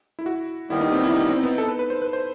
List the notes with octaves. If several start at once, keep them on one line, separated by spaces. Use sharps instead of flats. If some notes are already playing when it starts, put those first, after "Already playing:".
E4
F#4
D#2 D#3 G3 B3 E4
D#4
C4
E4
D#4
C4
B3
A4
B4
B4
C5
B4
C5